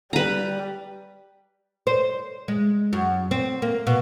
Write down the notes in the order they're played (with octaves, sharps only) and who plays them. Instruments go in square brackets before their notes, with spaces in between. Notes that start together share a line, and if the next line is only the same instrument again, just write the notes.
[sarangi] G3 [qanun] B4 A#5
[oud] C5
G#3
F#2
C4
A#3
B2